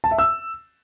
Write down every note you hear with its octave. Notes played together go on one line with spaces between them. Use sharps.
A5
E5
E6